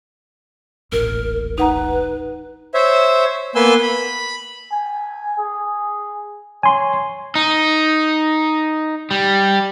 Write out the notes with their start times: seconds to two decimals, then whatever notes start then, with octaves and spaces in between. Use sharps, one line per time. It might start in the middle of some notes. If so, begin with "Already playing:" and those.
0.92 D#1 A1 A#4
1.58 D#4 B4 F#5 A#5
2.74 C5 C#5 E5
3.55 A#3 B3 B4 G#5 C6 E6
3.82 B5
4.71 G#5
5.38 G#4
6.63 C#5 G#5 C6
7.35 D#4
9.11 G3